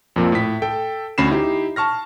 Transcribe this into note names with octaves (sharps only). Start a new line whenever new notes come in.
F2 A#2
A2 B6
A4 G5
D2 C#4 B5 C7 E7
D#4 E4 G4
A5 C#6 F6 A#6